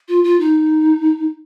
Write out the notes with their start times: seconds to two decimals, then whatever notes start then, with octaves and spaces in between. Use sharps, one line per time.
0.08 F4
0.24 F4
0.40 D#4